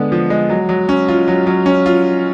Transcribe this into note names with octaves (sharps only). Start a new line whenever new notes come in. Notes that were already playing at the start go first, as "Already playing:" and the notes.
Already playing: D3 G#3 B3
F3
G#3
F#3
F#3
C#4
F4
F#3
F#3
C#4
F4